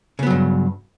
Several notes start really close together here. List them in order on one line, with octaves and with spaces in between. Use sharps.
C#3 B3 F#3 G2